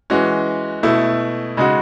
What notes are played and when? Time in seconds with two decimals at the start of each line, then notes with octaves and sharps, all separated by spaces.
0.10 E3 G#3 C#4 F#4
0.83 B2 A3 E4
1.57 C#3 G#3 D#4 F#4